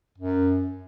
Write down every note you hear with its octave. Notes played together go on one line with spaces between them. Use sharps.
F#2